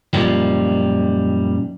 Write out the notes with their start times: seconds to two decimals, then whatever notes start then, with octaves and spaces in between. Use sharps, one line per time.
0.13 F#2 A#2 D#3 F3 G3